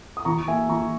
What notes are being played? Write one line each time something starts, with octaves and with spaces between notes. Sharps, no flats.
D#6
E3 A#5 C#6
A#3 E5 G#5
E3 A#5 C#6